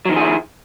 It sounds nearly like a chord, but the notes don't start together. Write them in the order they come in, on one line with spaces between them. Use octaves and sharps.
F#3 D#3 F3 G#4 E4